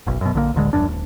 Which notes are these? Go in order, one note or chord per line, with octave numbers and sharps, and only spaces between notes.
F#1 B1
F#2 B2
A#1 D3 G#3 A#3
D1 A#1 D3 G#3
D#1 F#2 D4
D#1